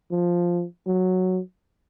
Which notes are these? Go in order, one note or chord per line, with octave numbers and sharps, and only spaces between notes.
F3
F#3